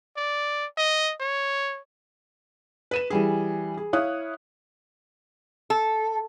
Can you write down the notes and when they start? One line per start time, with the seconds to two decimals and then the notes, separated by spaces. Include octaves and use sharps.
0.17 D5
0.78 D#5
1.20 C#5
2.91 B4 D#7 E7
3.10 E3 G3 G#4
3.77 G#4
3.93 E4 C#5 F5 D#6 F#6
5.70 A4